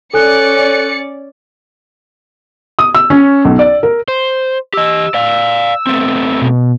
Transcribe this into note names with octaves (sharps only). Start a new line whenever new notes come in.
C#4 A4 D5 G#5 F#6 C#7
D#6
E6
C#4
B1
D5
A#4
C5
G4 D#5 E6
D5 F5
A3 B3 C4
B2